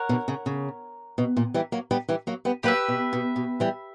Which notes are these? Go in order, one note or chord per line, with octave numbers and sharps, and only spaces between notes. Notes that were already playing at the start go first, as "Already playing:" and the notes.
Already playing: A#4 C#5 F#5
B2 D3
C#3
C#3
B2
A#2
E3 G3
F#3 A#3
G3 B3
E3 G3
F#3 A#3
G3 B3
F#3 A#3 G4 B4 E5
B2
B2
B2
E3 G3